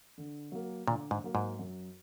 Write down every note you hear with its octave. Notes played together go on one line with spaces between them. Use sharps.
D3
F#3 A#3
A#2 D3
G#2
F#3 A#3
G#2
F#2